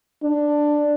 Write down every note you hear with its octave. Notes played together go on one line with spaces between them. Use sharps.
D4